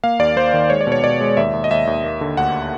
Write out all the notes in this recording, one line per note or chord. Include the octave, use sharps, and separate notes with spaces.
A#3 F5
D#2 D5
A#3 C5
D#3
G#3 C#5
D5
B2
C#5
B2 D5
G#3
D#2 E5
D#2
D#5
D#2 E5
D#2
A#3
D3
D2 F#5